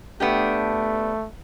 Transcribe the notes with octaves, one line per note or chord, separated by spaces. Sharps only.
A3 B3 D4 G4